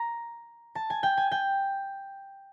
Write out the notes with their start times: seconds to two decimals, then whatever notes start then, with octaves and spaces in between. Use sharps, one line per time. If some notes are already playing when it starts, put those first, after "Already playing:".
Already playing: A#5
0.75 A5
0.90 G#5
1.03 G5
1.17 G#5
1.32 G5